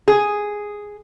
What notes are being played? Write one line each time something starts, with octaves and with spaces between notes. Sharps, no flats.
G#4